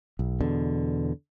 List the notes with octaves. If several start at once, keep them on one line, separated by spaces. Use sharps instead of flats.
B1
E2 B2 D3